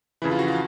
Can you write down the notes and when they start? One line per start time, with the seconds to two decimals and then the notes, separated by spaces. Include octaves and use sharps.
0.22 F2 C#3 E3 E4
0.31 F4
0.39 F#4
0.48 F4